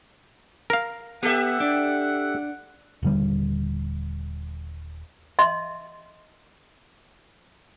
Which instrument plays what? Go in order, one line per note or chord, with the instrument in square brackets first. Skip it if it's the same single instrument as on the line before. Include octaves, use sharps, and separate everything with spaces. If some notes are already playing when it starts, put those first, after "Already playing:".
[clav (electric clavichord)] A#4 F5
[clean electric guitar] B3 [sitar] G4 A4 E5 [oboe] F#5
[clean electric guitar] D4
[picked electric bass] D#1 D3 G3
[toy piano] D#5 E5 C6